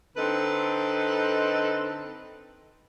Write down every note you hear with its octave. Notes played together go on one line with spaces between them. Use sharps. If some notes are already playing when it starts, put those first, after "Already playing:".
D3 C4 D#4 A4 B4